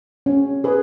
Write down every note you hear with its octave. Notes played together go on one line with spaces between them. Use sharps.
C#4
G#4 B4